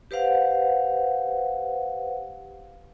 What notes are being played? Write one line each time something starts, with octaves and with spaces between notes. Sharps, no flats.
G4 B4 C5 F5 F#5